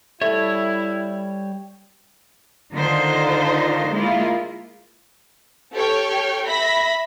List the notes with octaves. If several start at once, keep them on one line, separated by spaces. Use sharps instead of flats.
G3 E4 A4 C#5 E5
D3 D#3 D4 D#4 F4 C5
G#3 A#3 E4 F4
G4 A4 C#5 G5 C#6 F6
E5 B5 A#6 B6